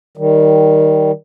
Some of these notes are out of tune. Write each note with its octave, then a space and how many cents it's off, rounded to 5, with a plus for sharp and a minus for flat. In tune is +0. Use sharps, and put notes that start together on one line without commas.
D#3 +0 G3 -20